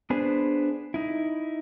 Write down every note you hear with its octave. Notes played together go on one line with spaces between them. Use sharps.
B3 D4 G#4 B4 C5
D#4 E4